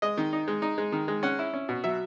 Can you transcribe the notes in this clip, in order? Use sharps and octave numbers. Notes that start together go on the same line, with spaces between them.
G#3 D#5
D#3
D#4
G#3
D#4
G#3
D#3
G#3
C#4 F#5
E4
C#4
B2
F#3 E5